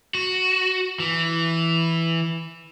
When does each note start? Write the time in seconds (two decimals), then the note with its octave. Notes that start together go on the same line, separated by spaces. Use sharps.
0.15 F#4
1.00 E3